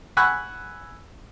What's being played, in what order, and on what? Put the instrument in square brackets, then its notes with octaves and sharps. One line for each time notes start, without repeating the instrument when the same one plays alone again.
[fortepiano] F#5 G#5 B5 C#6 E6 F#6